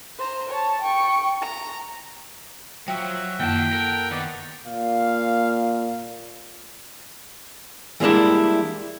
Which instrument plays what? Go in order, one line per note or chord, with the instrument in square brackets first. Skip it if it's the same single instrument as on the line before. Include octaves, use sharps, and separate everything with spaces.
[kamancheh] C5 A#5
C#5 A5
G5 C#6
A#5
[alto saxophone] F3 [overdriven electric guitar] F#3 [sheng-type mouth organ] F#4 E5 [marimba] G5
[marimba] F#2 A#3 [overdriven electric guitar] D#3 A5 [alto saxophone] G5
[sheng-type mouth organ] A4 F#5 [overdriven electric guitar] A#4
[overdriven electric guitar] D#3 [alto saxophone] B3 [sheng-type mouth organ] D5
[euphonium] A#2 [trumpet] F5
[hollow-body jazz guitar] E3 G3 G#3 A#3 D4 E4